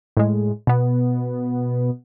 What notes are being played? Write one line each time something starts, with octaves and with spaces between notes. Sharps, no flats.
A2 G#3
B2 B3